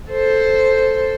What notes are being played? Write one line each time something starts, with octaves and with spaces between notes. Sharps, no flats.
A4 C5